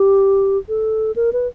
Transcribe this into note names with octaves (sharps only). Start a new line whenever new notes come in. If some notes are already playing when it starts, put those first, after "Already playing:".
Already playing: G4
A4
A#4
B4